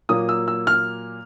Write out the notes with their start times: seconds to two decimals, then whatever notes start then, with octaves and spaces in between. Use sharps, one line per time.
0.09 A#2 F#3 A#3 D#6
0.29 E6
0.48 E6
0.67 F6